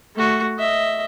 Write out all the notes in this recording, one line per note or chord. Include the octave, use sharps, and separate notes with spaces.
A3 F#4
D#5 E5